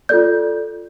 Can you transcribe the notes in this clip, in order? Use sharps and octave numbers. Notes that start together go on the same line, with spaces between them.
F4 A4 D5 G6